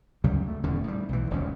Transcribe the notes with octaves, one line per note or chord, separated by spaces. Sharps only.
D2 C#3 F#3 G3
A3
D#1 E2 D3 C#4
A2 G3
B1 E3
D#1 C#2 F3 C#4